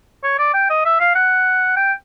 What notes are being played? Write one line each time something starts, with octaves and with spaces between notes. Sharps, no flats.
C#5
D5
G5
D#5
E5
F5
F#5
G5